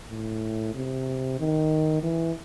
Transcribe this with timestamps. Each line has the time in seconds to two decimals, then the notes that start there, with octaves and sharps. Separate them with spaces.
0.10 A2
0.75 C3
1.40 D#3
2.03 E3